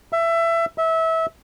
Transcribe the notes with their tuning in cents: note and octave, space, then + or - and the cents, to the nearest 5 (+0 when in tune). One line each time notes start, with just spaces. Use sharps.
E5 +20
E5 -25